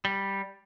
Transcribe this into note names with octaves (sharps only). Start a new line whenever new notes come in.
G3